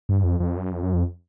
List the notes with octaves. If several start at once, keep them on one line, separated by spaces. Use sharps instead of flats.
G2
F2
F2
F#2
F2
F#2
F2